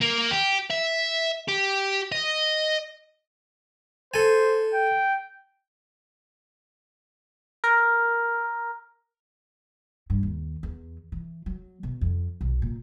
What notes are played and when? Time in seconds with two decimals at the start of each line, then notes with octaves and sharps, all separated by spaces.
0.01 A#3
0.31 G4
0.71 E5
1.48 G4
2.12 D#5
4.14 A4 C5 G#5
4.74 G5
7.64 A#4
10.10 G2
10.23 D#2
10.63 E2
11.12 E3
11.46 F#3
11.83 B2
12.01 F2
12.41 B1
12.62 A#2